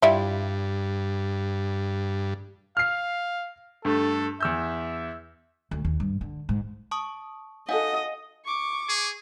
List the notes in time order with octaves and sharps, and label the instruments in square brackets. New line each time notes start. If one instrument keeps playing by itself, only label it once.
[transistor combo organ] G2 [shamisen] G3 E4 F4
[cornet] F5 [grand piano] F6 C7
[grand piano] G2 A3 [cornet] A4
[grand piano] E2 E6 G6 [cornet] E5
[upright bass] D2
D#2
G2
D3
G#2
[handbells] A5 C#6 D#6
[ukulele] D#4 F#4 A4 [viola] D#5 [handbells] F5 F#5 G#5
[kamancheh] C#6 D6
[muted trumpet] G#4